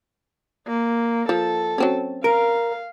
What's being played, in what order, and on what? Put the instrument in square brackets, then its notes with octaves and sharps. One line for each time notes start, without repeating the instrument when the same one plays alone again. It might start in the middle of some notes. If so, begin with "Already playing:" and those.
[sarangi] A#3
[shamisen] F3 [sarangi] A4
[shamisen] F#3 C4 C#4
[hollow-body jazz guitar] A#4 [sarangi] F5